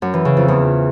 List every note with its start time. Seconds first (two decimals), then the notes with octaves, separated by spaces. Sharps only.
0.02 F#2
0.14 E3
0.25 C#3
0.37 F2
0.48 E2